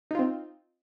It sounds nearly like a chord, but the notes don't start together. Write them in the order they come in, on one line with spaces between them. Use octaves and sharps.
D#4 F4 C4